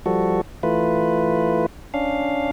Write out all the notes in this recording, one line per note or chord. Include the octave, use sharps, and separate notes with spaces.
F3 G3 F#4 A4
E3 A3 F4 B4
C#4 D4 F5